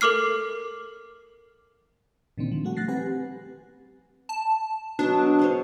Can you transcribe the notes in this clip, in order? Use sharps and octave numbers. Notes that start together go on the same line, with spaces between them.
A4 A#4 D6 F6 C7
A#2 D3 D#3 C4
F3
G3 A3 F#4 F#5
F#6 A6 A#6 C7
C4 G4 B4 F#5 G#5
A5
B2 F#3 D4
G#4 C5 C#5